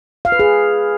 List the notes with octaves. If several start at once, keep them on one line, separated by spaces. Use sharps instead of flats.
F5
B4
G#4